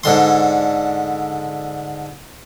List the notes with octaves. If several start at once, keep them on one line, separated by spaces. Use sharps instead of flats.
G#2 D3 C6